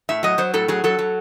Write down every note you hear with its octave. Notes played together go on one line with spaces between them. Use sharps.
A2 E5
F#3 D#5
F#3 C5
A2 A4
F#3 G#4
F#3 A4
F#3